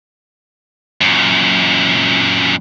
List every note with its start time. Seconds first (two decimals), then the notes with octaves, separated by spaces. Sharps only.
1.01 F#2 A#2